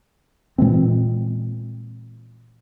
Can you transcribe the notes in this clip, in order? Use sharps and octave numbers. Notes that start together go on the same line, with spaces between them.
A#2 E3 G#3 C4